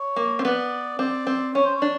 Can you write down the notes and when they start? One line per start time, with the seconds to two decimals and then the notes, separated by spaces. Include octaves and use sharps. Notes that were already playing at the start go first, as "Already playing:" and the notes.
Already playing: C#5
0.16 A#3
0.39 C4
0.45 B3 D5
0.99 C4 D5
1.27 C4
1.55 C#4 C#5
1.65 C5
1.76 C#5
1.82 D4